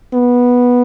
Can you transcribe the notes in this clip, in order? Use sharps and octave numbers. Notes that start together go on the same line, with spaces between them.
B3